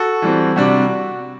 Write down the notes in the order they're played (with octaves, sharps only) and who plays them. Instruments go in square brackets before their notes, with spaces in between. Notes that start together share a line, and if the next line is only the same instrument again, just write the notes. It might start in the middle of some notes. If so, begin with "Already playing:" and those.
Already playing: [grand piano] F#4 A4
E3 G3 C4
C3 G3 D4 F#4